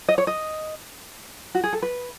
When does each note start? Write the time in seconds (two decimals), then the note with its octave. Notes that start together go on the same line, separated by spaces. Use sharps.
0.09 D#5
0.18 C#5
0.27 D#5
1.55 F#4
1.64 G#4
1.73 A4
1.82 B4